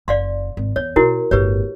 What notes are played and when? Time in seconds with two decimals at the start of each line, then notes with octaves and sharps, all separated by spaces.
0.08 F#1 D5 F5 C6
0.57 G#1
0.76 E2 C#5
0.96 B2 E4 F#4 A#4
1.31 G1 A2 G4 B4 C#5